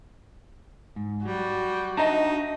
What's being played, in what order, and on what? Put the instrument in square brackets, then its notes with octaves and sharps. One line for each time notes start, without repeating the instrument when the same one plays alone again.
[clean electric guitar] G#2
[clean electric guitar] F#3 [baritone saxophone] G3 [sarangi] F#4
[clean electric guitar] D4 E5 A5 [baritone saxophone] D#4 [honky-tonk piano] D#5 A#5